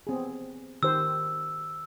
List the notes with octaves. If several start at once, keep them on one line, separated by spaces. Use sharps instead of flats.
B3 C4 G#4
D#3 G4 C5 E6